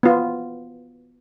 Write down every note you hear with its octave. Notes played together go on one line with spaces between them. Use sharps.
B3 F4